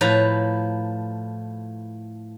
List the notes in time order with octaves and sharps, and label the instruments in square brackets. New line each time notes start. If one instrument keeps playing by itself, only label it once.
[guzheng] A2 F3 B4 A#5